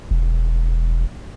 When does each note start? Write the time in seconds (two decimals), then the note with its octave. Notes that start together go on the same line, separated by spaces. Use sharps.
0.11 E1